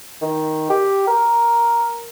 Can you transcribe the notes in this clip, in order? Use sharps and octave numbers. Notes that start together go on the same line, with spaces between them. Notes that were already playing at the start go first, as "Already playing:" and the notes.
D#3
G4
A#4